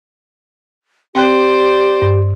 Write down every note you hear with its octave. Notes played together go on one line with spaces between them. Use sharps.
C4 G4 C5 D5 G5 F#6
G2